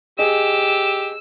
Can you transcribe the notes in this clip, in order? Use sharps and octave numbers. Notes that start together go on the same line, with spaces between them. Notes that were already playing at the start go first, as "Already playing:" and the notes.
G4 G#4 D#5 E6